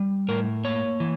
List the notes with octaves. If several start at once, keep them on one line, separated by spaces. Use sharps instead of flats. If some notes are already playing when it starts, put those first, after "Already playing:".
Already playing: G3
A2 A#4
A#3 C#5
E3